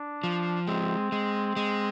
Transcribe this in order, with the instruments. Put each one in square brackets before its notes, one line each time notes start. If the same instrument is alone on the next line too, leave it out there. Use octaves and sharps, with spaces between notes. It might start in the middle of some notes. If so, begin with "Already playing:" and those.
Already playing: [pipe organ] D4
[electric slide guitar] F3
[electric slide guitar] G#3 [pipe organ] C4
[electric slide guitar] G#3
G#3